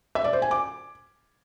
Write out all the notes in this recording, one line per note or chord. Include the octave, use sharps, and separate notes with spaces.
E5
D5
C5
G#5
D6